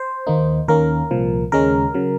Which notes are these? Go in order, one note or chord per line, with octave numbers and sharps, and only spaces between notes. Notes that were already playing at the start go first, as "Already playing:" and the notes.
Already playing: C5
D#2 D#3 A#3 D#4
D#2 D#3 A#3 C#4 A#4
C2 A#2 F3
D#2 C#3 G#3 C#4 A#4
C#3 F#3